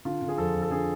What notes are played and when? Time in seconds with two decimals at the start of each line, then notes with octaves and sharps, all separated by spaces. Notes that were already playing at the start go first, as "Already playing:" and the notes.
0.05 D3 F4
0.22 D3
0.28 G#4
0.38 F2 A4
0.54 F2
0.62 A4
0.71 D3 G#4